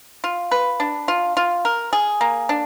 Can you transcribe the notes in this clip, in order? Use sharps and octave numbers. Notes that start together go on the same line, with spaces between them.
F4
B4
D4
F4
F4
A#4
G#4
A#3
D4